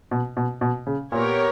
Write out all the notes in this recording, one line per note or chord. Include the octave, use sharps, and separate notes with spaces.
B2
B2
B2
C#3
A#2 B3 G4 A#4 C#5